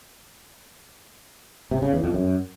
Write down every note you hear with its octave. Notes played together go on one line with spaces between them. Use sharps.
C3
C#3
E2
F2
F#2